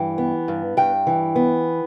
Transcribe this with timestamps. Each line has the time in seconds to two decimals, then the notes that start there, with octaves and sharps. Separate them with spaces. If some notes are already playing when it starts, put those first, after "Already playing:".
Already playing: G2 E3 G5
0.18 B3
0.48 G2
0.77 G2 G5
1.07 E3
1.36 B3